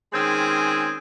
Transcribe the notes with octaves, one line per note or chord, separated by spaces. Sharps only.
D#3 G#3 C4 C#4 G#4